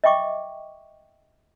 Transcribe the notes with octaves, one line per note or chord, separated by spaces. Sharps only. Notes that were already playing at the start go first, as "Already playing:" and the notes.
D#5 E5 G5 C#6 D6